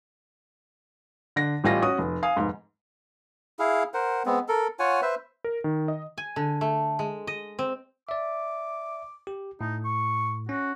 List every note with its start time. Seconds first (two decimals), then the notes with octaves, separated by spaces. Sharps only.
1.36 D3 A#6
1.64 A1 A2 G3 F4 G#5 A#6
1.82 C#4 F#4 D#6
1.98 F1
2.23 F5 G#5 D#6
2.37 F1 G#2
3.59 E4 G#4 F5
3.94 A#4 C5 F#5
4.26 G#3 B3 C4
4.48 A4 A#4
4.79 F4 C#5 F#5 G#5
5.02 B4 C5 E5
5.44 A#4
5.64 D#3
5.88 D#5
6.18 G#5
6.36 D3
6.61 A3
6.99 G#3
7.27 D#5
7.59 C4
8.09 D5 E5 D6
9.27 G4
9.61 A2 D#4
9.85 C#6
10.49 C#4 F#4